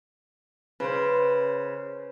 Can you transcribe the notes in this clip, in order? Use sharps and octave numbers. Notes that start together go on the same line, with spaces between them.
C#3 B4 C5